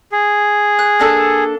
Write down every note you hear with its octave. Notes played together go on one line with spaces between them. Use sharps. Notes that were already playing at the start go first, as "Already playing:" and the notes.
G#4
F#6
A#3 D4 A4